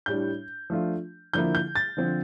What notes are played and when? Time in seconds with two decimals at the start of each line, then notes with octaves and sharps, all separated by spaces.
0.06 A2 G3 D4 G6
0.70 F3 A3 D4 F4
1.33 D3 F3 A#3 E4 G6
1.55 G6
1.75 A6
1.97 D3 F3 C4